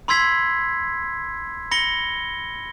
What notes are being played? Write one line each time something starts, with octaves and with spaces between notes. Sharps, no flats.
B5 C6 E6 G#6 B6 C7
B5 A#6 C#7 G7